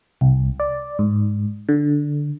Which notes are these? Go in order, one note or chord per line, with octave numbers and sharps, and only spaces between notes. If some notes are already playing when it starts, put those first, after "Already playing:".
C2
D5
G#2
D3